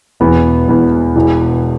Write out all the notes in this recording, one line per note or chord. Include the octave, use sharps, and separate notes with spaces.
E1 E2 E3 B3
E1 E2 E3 B3
E1 E2 E3